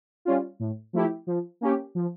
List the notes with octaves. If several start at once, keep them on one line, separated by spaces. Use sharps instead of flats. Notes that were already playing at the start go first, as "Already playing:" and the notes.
G3 C#4 F4
A2
F3 A3 E4 G4
F3
A#3 C#4 G4
F3